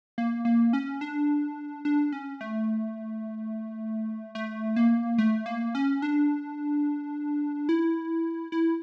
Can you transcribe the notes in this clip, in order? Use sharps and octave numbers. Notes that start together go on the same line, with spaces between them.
A#3
A#3
C#4
D4
D4
C#4
A3
A3
A#3
A3
A#3
C#4
D4
E4
E4